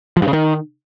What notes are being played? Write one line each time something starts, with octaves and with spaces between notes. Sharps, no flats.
F3
G2
C#3
D#3